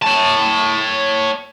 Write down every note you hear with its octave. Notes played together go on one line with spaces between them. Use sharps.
C#5 A5